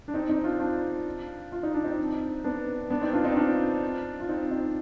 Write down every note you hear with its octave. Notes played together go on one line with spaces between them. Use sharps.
D4
C4 D#4
C4 D#4
D4 F4
D4 F4
F4
D#4
D4
C4 D#4
B3 D4
B3 D4
C4 D#4
D4 F4
C4 D#4
D4 F4
F4
C4 D#4
C4 D#4